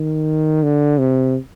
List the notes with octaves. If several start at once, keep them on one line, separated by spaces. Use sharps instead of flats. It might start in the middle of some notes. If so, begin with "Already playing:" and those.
Already playing: D#3
D3
C3